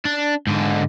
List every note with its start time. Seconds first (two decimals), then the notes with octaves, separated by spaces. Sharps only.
0.05 D4
0.47 G#2 D3